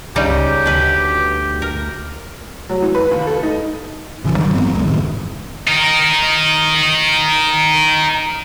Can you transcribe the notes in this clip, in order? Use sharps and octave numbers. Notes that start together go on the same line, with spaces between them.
C#2 C#3 G3 D#4 G4
D2 B2 B4
A#4
F#3
E3
B4
D#2
A4
D#4
A1 C#3 E3 F3
G2 D#3 F#3 G3
A1 F#3 B3 C4
C#2 F#3 G#3
F#1 A2 D#3
D#4 A#4